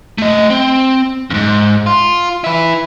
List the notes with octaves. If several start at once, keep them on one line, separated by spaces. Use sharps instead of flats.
A3 D#5
C4
F2 G#2
F4
E4 B4